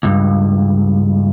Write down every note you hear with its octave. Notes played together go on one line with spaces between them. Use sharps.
C#2 G2